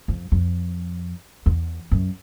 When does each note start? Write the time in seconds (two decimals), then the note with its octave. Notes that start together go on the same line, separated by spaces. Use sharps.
0.08 F2
0.32 F2
1.46 E2
1.92 F#2